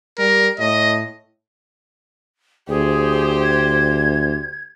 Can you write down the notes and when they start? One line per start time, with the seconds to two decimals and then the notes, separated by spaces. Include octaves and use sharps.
0.19 G3 A#4
0.59 A2 D#5
2.69 D2 G4 G#4 C5
3.42 G#6